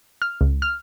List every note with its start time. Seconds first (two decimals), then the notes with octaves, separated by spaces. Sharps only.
0.22 F6
0.41 C#2
0.62 F6